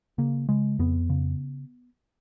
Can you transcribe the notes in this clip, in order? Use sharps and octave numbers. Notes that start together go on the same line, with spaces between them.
C#3 A#3
C#3 G#3
F2 B3
C#3